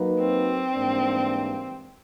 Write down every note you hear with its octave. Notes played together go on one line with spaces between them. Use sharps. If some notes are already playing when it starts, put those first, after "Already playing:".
Already playing: F#3 A#3 D#4 F#4 B4
C4
G#2 E3 G3 A#3 D4